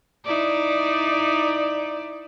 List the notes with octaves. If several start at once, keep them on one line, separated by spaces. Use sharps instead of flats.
D#4 E4 D5